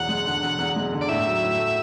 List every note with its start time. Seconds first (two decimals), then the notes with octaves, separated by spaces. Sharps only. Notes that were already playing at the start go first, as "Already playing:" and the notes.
Already playing: E1 E2 F#5
0.09 G#3
0.25 D3
0.43 E1
0.59 E2
0.76 G#3
0.93 D3
1.01 D5
1.08 A2 E5
1.26 F#3
1.43 A2
1.58 A3